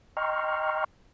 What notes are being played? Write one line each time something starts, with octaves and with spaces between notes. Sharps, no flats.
D#5 G5 A#5 C6 C#6 F6